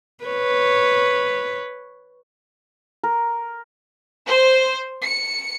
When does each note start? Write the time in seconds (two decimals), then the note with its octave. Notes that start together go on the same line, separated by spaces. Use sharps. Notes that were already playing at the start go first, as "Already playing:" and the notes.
0.25 B4 C#5
3.03 A#4
4.26 C5
5.01 C#7